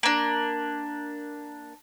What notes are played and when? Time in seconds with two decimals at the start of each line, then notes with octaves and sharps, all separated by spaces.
0.03 A#3 D4